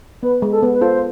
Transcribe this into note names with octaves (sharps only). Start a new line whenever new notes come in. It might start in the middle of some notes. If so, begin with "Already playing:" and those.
B3 B4
G#3
A4
B3
B4
F4 A4 C5